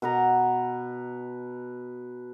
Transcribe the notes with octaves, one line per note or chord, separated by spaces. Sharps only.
B2 B4 A#5